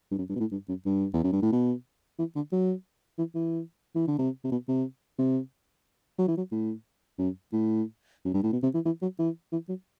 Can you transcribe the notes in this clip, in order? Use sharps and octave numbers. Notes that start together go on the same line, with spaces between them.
G2
F#2
G2
B2
A2
G2
F#2
G2
E2
F#2
G2
A2
B2
E3
D3
F#3
E3
E3
E3
D3
C3
C3
B2
C3
C3
F#3
E3
F#3
A2
F#2
A2
F#2
G2
A2
B2
C3
E3
E3
F#3
E3
E3
F#3